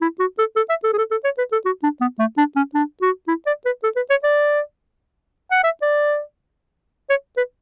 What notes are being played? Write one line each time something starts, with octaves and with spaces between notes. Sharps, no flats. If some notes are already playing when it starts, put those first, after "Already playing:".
E4
F#4
A4
A4
E5
A4
G#4
A4
A4
C#5
B4
A4
F#4
D4
B3
A3
D4
C#4
D4
F#4
E4
D5
B4
A4
B4
C#5
D5
F#5
E5
D5
C#5
B4